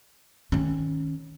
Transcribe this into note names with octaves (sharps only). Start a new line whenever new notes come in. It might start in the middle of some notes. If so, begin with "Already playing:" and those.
D#3 C#4